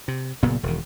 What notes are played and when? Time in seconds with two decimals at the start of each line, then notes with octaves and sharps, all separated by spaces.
0.08 C3
0.43 F#1 A#2 C#3 B3
0.63 E1 D#3